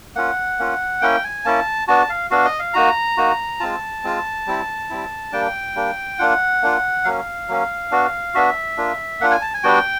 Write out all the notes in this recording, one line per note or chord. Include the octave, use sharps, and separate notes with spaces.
A#3 C#4 F4 F#5
A#3 C#4 F4
A#3 C#4 E4 G5
G#5
A#3 C#4 E4 A5
B3 D4 F#4 A5
F5
B3 D4 F#4 F5
D#5
F5
A#3 D#4 F#4 A#5
A#3 D#4 F#4
G#3 C4 F4 A5
G#3 C4 F4
G3 C4 E4
G3 C4 E4
G3 A#3 D4 G5
G3 A#3 D4
A#3 D4 F4 F#5
A#3 D4 F4
F#3 A#3 C#4 F5
F#3 A#3 C#4
B3 D4 F#4
B3 D4 F#4 E5
A#3 D4 F4
A#3 D4 F4 F#5
G#5
A5
G#5
G3 B3 D4 F#4 G5